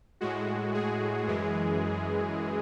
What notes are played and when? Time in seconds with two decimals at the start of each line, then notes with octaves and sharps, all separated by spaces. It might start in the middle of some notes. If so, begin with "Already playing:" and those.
0.21 A2 G#3 F#4
0.74 G#4
1.27 F#2 E3 G#3